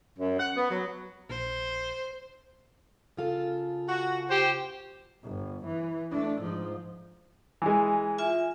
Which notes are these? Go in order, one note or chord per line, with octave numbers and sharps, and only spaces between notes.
F#2
F#5
B3
F#3
A#1 C5
C#3 F4 A4
F#4
G4 C5
G1
E3
A3 D4
G#2 F3
E3 G#3
F4 E5 G#5